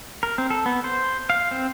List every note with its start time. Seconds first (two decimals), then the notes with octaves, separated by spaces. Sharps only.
0.23 A#4
0.38 C4
0.50 A4
0.66 B3
0.84 C5
1.30 F5
1.51 C4